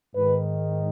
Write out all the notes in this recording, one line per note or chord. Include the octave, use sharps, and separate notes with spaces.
G#2 D#3 B4